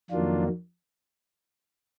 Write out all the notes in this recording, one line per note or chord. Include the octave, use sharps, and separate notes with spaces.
F2 D#3 F#3 A#3 D4 F4